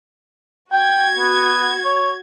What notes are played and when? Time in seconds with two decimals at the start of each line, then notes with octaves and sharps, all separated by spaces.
0.72 F#4 G5 G#6
1.17 B3
1.84 C#5